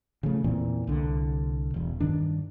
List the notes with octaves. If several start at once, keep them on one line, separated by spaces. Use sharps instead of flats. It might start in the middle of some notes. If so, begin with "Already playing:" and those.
C#3 F3 A3
E2 A#2 E3 C4
C2 D3
E1 E2
G2 D#3 D4